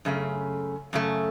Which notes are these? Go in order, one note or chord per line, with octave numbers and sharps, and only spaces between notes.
F#2 C#3 A3
F#2 C#3 A3